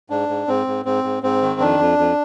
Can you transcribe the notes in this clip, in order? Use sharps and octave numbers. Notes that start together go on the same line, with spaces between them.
G#2 D4
G#2
G#2 C4
G#2
G#2 C4
G#2
G#2 C4
D#3
F2 D4
F2
F2